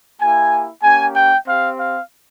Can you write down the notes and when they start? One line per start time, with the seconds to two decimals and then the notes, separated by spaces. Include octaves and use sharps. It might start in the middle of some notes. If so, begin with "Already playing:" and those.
0.20 A#3 E4 G4 G#5
0.82 A#3 C#4 G4 G#5
1.14 G5
1.46 C4 G4 F5
1.77 F5